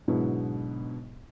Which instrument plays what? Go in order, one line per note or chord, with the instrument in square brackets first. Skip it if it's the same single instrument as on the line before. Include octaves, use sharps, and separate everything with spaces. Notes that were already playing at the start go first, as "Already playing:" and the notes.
[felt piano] G#2 B2 D3 F#3 B3 E4